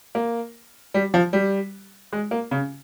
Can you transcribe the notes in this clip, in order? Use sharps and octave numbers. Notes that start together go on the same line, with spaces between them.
A#3
G3
F3
G3
G#3
A#3
C#3